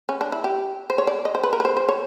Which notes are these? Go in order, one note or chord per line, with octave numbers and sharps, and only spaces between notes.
C#4
D4
E4
G4
C5
C#5
D5
D#5
C5
B4
A#4
B4
C5
C5
C#5